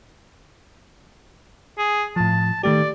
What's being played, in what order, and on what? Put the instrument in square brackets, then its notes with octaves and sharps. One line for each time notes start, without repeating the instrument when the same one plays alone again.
[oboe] G#4
[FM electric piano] A2 F3 [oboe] A5
[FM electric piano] D#3 A3 G4 [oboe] D5